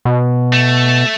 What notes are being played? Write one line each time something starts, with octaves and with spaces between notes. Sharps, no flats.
B2
A3